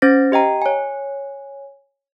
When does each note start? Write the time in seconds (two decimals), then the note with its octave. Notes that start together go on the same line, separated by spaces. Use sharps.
0.02 C#4 C5 A6 A#6
0.32 G4 D#5 G5 A#5
0.62 C#5 G#5